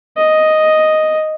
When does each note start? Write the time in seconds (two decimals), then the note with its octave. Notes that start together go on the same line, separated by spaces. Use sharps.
0.17 D#5